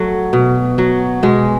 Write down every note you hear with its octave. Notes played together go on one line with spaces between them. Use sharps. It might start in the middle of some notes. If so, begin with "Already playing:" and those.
Already playing: F#3 A3
B2
F#3
B2 G#3